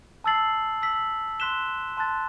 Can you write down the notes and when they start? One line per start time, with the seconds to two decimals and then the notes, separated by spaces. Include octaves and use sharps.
0.24 A5 E6 A6 C7 F#7
0.82 E6 B6 F#7
1.40 C6 F#6 B6 E7 G7
1.97 A5 C6 F#6 A6